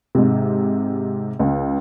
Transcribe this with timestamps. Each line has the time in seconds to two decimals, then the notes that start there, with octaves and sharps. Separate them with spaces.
0.15 G#2 C3
1.39 C#2